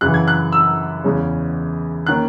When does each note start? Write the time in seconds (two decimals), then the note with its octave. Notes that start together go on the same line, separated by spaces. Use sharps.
0.01 F#2 C#3 E3 F#6
0.14 G#6
0.28 F#6
0.52 E6
1.04 E2 C#3 G#3 C#4
2.06 D#3 A#3 C#4 F#6